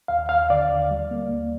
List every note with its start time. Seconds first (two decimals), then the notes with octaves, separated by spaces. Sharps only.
0.08 D#2 F5
0.29 D#2 F5
0.50 D3 D5
0.69 D#2
0.91 G3
1.11 A#3
1.30 D#2